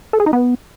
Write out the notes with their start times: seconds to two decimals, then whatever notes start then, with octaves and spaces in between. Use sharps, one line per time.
0.13 A4
0.20 G#4
0.26 D#4
0.33 B3